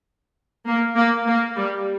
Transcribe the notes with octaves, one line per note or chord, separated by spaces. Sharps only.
A#3
A#3
A#3
G3